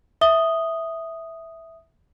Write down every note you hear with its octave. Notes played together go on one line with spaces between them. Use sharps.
E5 D#6 G7